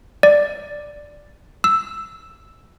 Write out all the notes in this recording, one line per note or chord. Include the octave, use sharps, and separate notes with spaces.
D5
E6